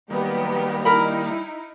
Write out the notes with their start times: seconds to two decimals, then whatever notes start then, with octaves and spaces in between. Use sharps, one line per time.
0.10 D#3 F#3 G3 A#3 B3 G4
0.85 D#4 E4 A#4 B5